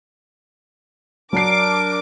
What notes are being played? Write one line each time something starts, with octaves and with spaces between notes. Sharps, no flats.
F#3 D4 A#4 D6 C7